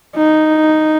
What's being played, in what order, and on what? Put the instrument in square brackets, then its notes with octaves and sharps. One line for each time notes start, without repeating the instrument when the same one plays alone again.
[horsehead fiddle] D#4